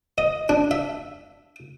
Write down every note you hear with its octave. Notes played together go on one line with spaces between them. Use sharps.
D#5
D4
E5